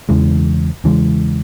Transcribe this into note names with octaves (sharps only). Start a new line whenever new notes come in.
E2 C#3 E3 G#3
E2 C#3 E3 G#3